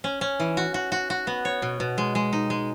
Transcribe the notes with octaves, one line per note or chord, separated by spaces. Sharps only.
C#4
C#4
E3
F#4
F#4
F#4
F#4
B3
C#5
B2
B2
G#3
G#3
D#4
G#3